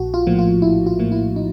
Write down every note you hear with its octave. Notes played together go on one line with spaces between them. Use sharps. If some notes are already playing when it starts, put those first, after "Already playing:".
Already playing: A#1 F#4
F4
A2 F3 A#3
F4
A#1 E4
F4
A2 F3 A#3
E4
D#4